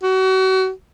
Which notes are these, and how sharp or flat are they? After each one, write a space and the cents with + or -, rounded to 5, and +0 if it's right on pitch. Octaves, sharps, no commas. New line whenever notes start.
F#4 +35